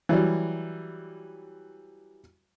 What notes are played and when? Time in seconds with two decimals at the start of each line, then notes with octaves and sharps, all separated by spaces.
0.09 E3 F#3 G3